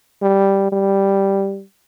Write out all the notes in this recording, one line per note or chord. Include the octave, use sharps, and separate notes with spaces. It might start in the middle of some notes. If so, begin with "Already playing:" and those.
G3
G3